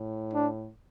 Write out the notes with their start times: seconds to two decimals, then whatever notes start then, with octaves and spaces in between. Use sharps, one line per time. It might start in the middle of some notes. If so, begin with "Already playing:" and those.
Already playing: A2
0.34 D4